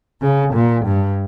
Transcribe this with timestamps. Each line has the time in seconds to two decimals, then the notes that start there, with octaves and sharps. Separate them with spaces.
0.21 C#3
0.54 A#2
0.86 G2